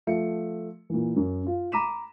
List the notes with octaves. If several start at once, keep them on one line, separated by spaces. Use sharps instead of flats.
F3 A3 E5 C#7
A#2 E3
F#2
F4
A#5 B5 D6 B6 D#7 E7